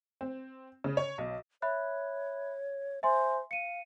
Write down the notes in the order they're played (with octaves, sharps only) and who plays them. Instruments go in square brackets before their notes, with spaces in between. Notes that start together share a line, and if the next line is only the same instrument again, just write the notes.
[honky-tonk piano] C4
C#3
C#5
B1
[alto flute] C#5 [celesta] E5 B5 F#6
[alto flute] C5 [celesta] E5 G#5 C6
[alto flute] F5 [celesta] C#7 D#7